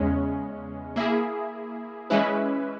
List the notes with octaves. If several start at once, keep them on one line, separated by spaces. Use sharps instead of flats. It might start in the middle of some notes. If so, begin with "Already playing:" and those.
Already playing: E2 C#3 G#3 C#4
A#3 E4 G#4
E3 G#3 C#4 E4 B4